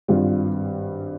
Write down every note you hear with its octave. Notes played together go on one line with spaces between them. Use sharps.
G#1 G2 G3 F4